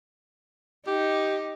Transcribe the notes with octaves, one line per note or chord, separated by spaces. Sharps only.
D#4 G4